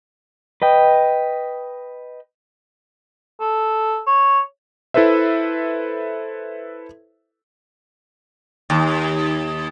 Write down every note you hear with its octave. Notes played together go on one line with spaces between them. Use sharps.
B4 D#5 G5
A4
C#5
E4 A4 B4 C5 E5
D#2